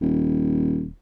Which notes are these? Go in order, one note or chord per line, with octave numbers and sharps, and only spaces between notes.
D#1